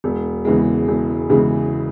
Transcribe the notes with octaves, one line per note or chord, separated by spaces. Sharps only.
E1
E2 C#3 E3 G#3
E1
E2 C#3 E3 G#3